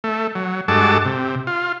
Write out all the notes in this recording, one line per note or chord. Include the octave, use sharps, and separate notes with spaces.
A3
F#3
G2 G#3 F#4 A4 A5 D6
C3
F4